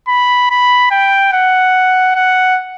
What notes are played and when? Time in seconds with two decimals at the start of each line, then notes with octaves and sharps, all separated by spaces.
0.08 B5
0.50 B5
0.91 G5
1.33 F#5
2.15 F#5